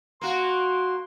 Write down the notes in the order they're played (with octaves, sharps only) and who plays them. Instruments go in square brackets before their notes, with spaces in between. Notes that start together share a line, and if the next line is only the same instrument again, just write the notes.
[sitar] A#3 F#4 [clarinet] C6